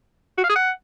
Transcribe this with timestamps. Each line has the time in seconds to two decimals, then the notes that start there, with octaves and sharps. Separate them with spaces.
0.38 F#4
0.44 F5
0.49 G#4
0.55 F#5